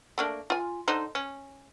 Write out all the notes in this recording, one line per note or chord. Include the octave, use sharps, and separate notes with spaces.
A3 A#3 D4
F4 G#5
D3 D#4 C5
C#4